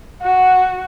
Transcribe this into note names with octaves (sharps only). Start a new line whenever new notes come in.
F#4 F#5